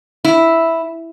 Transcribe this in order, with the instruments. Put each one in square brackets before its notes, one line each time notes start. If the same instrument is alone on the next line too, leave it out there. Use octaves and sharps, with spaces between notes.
[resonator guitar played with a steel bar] E4